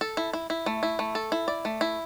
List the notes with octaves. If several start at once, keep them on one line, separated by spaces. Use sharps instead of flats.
A4
E4
E4
E4
A3
E4
A3
A4
E4
D5
A3
E4